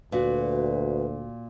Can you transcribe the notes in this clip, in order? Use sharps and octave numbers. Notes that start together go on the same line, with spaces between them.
D2 A#2 F#4 B4